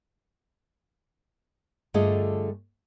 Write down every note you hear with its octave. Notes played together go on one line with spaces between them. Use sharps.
G2 D3 A3 F4 G#4 D#5